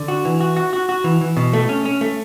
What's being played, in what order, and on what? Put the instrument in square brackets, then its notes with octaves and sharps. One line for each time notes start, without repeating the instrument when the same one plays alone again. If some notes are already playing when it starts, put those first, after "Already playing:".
Already playing: [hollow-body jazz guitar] D3
F#4
E3
F#4
F#4
F#4
F#4
E3
E3
B2
A3
C#4
C#4
A3